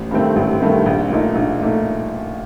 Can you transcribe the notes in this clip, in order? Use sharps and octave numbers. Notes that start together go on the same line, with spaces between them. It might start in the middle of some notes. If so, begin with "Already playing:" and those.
Already playing: A1
G2 D#3 A3 C4
A1
G2 D#3 A3 C4
A#1
A#2 A3 D#4
A#1
A#2 A3 D#4